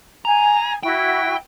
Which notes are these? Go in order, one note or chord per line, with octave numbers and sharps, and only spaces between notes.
G#5 A#5
E4 F#4 G5